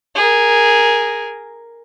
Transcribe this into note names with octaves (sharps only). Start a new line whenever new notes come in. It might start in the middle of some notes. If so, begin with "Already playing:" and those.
G#4 A#4